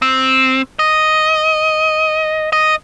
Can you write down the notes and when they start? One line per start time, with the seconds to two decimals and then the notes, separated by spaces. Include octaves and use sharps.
0.02 C4
0.79 D#5
2.52 D#5